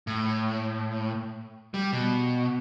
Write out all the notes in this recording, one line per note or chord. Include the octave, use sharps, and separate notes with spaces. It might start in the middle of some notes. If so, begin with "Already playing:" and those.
A2
G3
B2